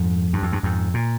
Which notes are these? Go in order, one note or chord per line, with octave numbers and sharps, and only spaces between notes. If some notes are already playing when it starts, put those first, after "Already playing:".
Already playing: F2 G#2
G2
F2
G2
F2 G#2
A#2